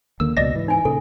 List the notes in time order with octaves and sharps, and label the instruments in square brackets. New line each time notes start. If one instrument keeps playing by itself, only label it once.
[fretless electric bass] D#2 D3 A#3 [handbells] E6
[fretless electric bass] C#2 B2 [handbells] D5 D#5 A#6
[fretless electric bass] G#2 E3
[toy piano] D#4 G#5
[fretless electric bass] A#2 C#3 [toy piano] A4